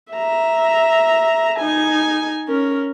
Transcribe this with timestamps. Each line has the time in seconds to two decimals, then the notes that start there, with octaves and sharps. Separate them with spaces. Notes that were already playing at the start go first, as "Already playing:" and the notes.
0.12 E5 A#5
1.59 D#4 G#5
2.48 C#4 A#4